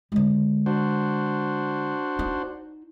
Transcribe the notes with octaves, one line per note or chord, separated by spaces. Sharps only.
D3 G#3
D4 F#4 C5
D#4 E4